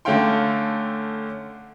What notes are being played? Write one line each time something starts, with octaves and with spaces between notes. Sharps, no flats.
D3 A3 C#4 F5 G5 C6